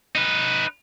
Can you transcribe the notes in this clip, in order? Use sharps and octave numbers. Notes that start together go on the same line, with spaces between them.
D#4 B4